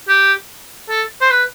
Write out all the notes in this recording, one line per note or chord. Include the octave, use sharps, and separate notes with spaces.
G4
A4
C5
B4